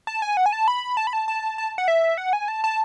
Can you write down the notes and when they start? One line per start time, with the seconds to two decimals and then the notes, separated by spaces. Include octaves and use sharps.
0.07 A5
0.22 G#5
0.37 F#5
0.46 G#5
0.53 A5
0.68 B5
0.97 A5
1.07 B5
1.13 A5
1.28 A5
1.58 A5
1.78 F#5
1.88 E5
2.18 F#5
2.33 G#5
2.48 A5
2.64 A5